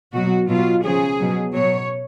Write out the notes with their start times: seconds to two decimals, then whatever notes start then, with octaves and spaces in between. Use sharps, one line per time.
0.13 B2 F#3 F#4
0.49 B2 F#3 F4
0.83 C#3 F3 G#4
1.19 B2 F#3
1.54 B2 F#3 C#5